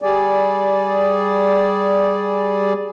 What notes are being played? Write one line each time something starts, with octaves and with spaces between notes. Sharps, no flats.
G3 G#4 D5